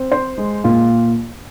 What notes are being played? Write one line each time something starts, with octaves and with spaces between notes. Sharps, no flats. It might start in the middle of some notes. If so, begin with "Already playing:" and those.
Already playing: C4
C5
G#3
A#2 F4